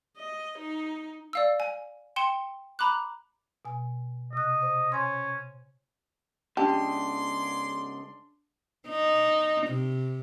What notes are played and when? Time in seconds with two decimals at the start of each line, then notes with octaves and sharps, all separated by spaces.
0.17 D#5
0.59 D#4
1.33 D5 F5 E6
1.60 G#5
2.16 G5 C6 C#7 E7 G7
2.79 A#5 B5 D6 F#6
3.65 B2 G#5
4.33 C3 D#5 F#6
4.62 C5
4.92 C#4 C#5 G#5 C6
6.57 G#2 C#3 D4 G4 G#4 D5 A5 C6
8.89 D#4
9.67 C3